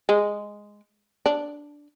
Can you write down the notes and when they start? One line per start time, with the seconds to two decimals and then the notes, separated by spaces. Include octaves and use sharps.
0.09 G#3
1.26 D4